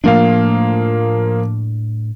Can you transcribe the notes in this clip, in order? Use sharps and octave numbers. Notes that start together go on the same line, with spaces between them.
A2 F3 A3 A#3 D4 F5